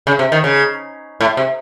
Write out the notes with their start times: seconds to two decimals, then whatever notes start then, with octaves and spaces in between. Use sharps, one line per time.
0.07 C#3
0.19 C3
0.32 D#3
0.44 C#3
1.21 A2
1.37 C3